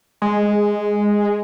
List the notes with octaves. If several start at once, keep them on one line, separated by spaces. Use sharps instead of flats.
G#3